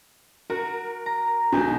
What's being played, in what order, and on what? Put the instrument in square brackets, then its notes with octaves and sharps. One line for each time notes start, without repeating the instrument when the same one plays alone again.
[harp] F#4 [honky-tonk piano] A#4
[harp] A#5
[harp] B1 G#5 G6 [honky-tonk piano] B2 F#3